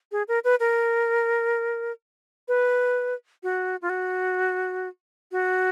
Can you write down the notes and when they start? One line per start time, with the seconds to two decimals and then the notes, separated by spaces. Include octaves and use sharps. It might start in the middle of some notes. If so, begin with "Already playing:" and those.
0.12 G#4
0.28 A#4
0.44 B4
0.60 A#4
2.48 B4
3.43 F#4
3.82 F4
3.89 F#4
5.32 F#4